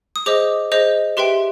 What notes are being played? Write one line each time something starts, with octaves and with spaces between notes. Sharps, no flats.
D#6
G#4 C5 D#5 D6
G#4 C5 D#5
G4 B4 E5 G5 C6